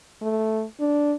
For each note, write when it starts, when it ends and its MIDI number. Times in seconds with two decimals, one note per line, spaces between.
0.22 0.65 57
0.80 1.15 62